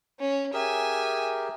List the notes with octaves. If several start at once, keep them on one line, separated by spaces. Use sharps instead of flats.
C#4
G4 G#4 A#4 E5 G#5